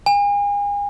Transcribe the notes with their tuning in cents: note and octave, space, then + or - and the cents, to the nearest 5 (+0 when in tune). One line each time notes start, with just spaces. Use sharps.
G#5 -35